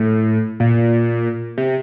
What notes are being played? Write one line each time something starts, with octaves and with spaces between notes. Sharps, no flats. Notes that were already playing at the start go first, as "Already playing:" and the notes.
Already playing: A2
A#2
C3